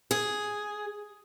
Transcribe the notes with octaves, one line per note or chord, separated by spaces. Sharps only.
G#4